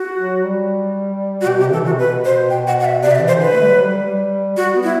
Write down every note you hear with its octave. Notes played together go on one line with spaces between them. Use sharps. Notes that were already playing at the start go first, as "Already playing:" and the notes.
Already playing: F#4
F#3
G3
F#4
B2 G4
C3 G4
E3 A4
C3 F#4
B2 B4
C5
B2 G5
F#5
F#5
E5
C3 D5
E5
D5
E3
C5
D3 B4
A3
G3
F#3
G3
G3
G3 F#4
B3
E4